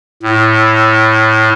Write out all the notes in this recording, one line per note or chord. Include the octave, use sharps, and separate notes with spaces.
A2